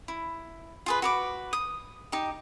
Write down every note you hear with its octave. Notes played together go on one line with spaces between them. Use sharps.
E4
F4 G#4 B4
F#4 B4 D6
D#6
D#4 G4